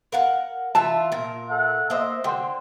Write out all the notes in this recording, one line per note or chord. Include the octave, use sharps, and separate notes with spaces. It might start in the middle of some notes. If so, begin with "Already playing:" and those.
A#4 F5 F#5
E3 F4 E5 A5
A#2 A#4
A4 E5 F#5
A#3 C5 D#5 E5
D3 C5 G5 C6